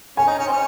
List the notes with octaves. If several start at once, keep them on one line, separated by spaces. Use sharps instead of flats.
C#4 G#5
D#4
C#4
C4
C#4